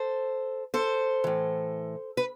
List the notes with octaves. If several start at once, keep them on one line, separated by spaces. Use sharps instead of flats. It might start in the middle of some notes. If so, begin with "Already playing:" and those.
Already playing: A4 C5
A4 C5
A2 E3
B4